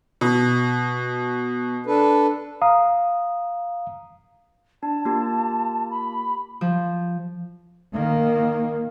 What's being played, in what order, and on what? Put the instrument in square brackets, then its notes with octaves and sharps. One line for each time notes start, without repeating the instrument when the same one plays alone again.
[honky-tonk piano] B2
[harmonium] D4 A4 B4
[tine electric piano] F5 A#5 D#6
[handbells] D4 [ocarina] A5
[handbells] A#3 F4 G4
[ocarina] B5
[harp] F3
[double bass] D#3 A#3